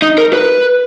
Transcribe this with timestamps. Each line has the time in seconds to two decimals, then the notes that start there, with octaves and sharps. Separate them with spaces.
0.02 D#4
0.18 A#4
0.33 B4